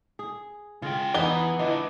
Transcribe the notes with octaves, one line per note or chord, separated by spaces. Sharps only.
G#4
C#3 G#3 F4 G5
E3 B3 D#4 G#4 G7
E3 D4 F4 B4 D#5